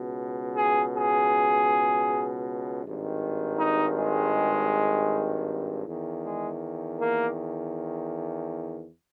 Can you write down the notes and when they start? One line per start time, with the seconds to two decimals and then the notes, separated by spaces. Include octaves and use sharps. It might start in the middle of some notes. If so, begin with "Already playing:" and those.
Already playing: C#2 B2
0.56 G#4
0.94 G#4
2.83 G#1 G2 D#3
3.58 D#4
3.96 G#3
5.85 E2 D#3
6.23 G#3
6.99 A#3